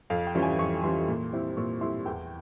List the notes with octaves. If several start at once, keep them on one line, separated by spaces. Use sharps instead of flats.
F2 F5
G5
E3 G3 C#4 F4
G#5
F2 C#6
E3 G3 C#4 F4 C6
A#2
G3 C4 E4
A#2 C#6
G3 C4 E4 C6
E2 G5